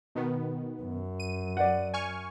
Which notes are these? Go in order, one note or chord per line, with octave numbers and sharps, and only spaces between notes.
B2 D#3 B3
F#2
D#7
D5 F#5
G#5 C#6 F6